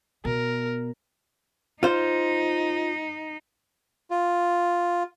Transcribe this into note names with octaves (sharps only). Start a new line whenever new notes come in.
B2 A#4
D#4 F4 C5
F4